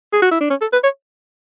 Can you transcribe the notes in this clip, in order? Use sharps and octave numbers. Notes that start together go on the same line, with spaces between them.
G#4
F#4
E4
D4
C#4
A4
B4
C#5